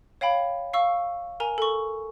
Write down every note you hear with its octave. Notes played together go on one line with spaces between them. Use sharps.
C#5 F5 G5 B5
F5 C#6 E6
A#4 G#5 A#5
A4 C#6